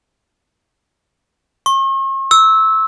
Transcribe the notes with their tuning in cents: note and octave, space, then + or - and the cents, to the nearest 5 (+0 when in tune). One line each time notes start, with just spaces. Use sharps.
C#6 -45
E6 -15